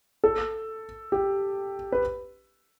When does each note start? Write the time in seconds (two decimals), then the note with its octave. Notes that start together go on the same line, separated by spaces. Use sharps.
0.24 A4
1.12 G4
1.92 B4